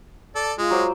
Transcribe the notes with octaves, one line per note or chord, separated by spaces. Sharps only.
A4 D5
G#3 F4
F#3 C5 D6